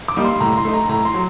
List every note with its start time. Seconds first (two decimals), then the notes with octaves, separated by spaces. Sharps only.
0.08 D6
0.17 G3 A#3 D#4
0.24 C6
0.40 A2 A#5
0.57 C6
0.65 A3 D#4
0.73 A#5
0.89 A2 A#5
1.05 C6
1.14 F#3